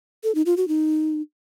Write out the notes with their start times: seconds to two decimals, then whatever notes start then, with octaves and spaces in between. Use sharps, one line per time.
0.24 A4
0.35 D#4
0.46 F4
0.57 F#4
0.68 D#4